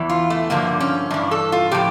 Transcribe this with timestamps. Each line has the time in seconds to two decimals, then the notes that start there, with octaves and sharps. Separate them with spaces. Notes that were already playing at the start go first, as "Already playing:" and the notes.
Already playing: E2 E3
0.10 F4
0.30 A3
0.50 G2 D3 F3 A#3
0.80 C#4
1.11 G2 E3 D4
1.31 A4
1.52 F4
1.71 A2 F3 G4